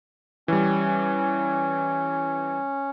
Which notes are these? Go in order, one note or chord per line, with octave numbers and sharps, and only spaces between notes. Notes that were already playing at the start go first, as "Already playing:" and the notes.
E3 G3 C#4